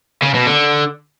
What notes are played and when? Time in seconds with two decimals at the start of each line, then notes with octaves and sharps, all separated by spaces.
0.22 C#3
0.34 B2
0.46 D3